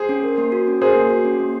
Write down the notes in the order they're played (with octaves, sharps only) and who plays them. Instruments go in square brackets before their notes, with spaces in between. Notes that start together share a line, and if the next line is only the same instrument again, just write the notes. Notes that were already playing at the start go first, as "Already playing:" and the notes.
Already playing: [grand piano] G#4 C5
[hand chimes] C#4
A#4
A#3
F#4
C#4
[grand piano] G#4 C5 [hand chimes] A#4
[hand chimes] A#3
F#4
C#4
A#3